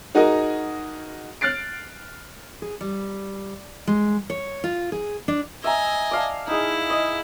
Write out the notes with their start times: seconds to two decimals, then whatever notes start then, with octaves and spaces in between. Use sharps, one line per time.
0.15 D#4 F#4 G#4 A#4 D#5
1.41 F6 F#6 A6 C7 D7
2.62 G#4
2.81 G3
3.87 G#3
4.30 C#5
4.64 F4
4.92 G#4
5.28 D4
5.64 D#5 E5 G#5 A#5
6.11 D5 F5 A5
6.47 D#4 E4 G#4
6.90 D#5